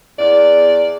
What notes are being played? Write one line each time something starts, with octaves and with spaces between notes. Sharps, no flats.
E2 D5